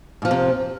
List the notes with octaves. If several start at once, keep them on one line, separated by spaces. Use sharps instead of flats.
F2 G#2 C3 F3